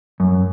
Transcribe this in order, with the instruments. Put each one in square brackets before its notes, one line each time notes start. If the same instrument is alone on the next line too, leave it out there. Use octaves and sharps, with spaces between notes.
[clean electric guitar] F#2